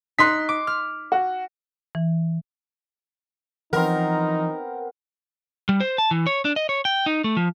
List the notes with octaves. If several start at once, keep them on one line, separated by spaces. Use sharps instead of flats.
D#4 C6 F#6 B6
D6
F6
F#4
E3
E3 F3 B3 C4 D#4 A#4
G3
C5
A5
E3
C#5
D4
D#5
C#5
G5
D#4
A3
F3